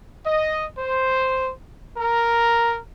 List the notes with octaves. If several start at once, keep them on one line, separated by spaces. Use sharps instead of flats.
D#5
C5
A#4